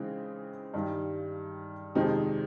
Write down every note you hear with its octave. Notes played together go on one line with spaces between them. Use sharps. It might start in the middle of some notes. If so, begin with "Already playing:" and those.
Already playing: C#3 E3 G#3 C4 D#4
G2 D#3 G3
F2 C3 D#3 G#3 C4